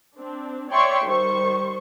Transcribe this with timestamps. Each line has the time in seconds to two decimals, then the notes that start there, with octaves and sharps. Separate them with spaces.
0.16 C4 D4
0.71 C#5 D5 E5 G5 C6 C#6
1.06 D#3 G3 C5 C#6